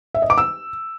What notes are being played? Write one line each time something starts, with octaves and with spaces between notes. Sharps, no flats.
E5
D#5
D6
E6